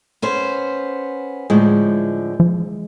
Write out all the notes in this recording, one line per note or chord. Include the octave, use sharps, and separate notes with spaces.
B3 C#4 C5
A2 D3 F3 G#3
F3